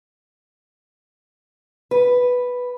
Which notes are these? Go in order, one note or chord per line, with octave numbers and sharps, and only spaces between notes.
B4